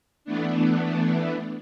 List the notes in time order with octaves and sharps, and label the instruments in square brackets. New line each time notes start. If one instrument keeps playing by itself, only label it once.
[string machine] E3 A3 B3 D4